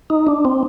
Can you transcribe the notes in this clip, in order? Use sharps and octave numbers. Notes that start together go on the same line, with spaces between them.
D#4
D4
C4